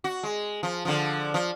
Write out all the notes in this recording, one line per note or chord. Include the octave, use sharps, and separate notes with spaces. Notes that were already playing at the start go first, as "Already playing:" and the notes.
F#4
G#3
F3
D3 F3
F3